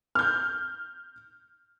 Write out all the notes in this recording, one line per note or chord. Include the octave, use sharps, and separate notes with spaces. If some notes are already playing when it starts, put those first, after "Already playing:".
F6 G6